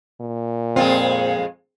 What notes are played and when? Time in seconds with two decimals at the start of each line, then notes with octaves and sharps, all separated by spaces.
0.21 A#2
0.76 F2 G#3 C4 F4